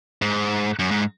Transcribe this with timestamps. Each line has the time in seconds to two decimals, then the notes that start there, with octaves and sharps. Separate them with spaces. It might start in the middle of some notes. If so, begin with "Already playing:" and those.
0.22 G#2
0.79 F#2
0.91 G#2